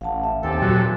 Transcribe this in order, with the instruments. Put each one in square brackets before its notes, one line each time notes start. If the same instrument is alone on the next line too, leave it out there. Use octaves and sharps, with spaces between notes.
[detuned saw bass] A1 [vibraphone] F5 F#5 A5
[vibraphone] E5
[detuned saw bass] D#2 [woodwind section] C4 G4 A4 [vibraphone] G5 G#5
[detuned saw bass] A#2 [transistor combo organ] F#3